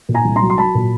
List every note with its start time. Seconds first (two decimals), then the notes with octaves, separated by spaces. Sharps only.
0.09 A#2
0.15 G#5 A#5
0.25 C2
0.36 A#5 C6
0.42 F#3
0.50 C6
0.58 F#3 A5 B5
0.75 A#2